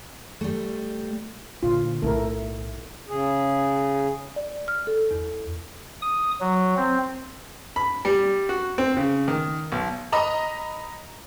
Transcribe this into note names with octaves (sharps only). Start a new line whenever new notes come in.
G3 A3
A#2 D3 F4
B1 A2 A3 E4 A#4
C#3 G#4
D5
F6
A4
E2
D#6
F#3
C4
B5
G3
F#4
C4
C#3
D#3
B1
D#5 A#5 B5